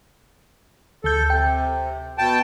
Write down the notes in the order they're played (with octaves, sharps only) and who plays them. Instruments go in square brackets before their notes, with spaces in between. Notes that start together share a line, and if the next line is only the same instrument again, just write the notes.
[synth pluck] D2 G6 [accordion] A4
[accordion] C3 [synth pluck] G5
[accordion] B2 G5 A5